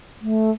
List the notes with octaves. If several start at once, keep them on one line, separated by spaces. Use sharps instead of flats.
A3